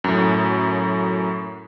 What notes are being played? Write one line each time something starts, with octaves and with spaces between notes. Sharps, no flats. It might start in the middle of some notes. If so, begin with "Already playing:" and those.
F#2 A2